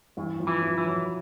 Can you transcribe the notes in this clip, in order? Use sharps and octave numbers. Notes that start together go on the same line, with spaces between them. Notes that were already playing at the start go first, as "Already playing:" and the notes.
G2 E3
F3
E3
F3
E3
F#3